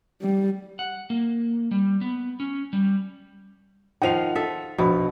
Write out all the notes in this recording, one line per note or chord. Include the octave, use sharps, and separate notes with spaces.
G3
F#5
A#3
G3
B3
C#4
G3
D#3 F3 F5 F#5 D#7 F7
A4 E5
A#1 B2 B5